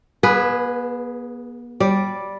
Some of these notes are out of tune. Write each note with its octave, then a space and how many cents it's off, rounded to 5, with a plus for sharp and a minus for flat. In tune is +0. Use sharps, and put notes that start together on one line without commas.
B3 -45 G#4 +0 B4 +0
G3 +0 D5 +0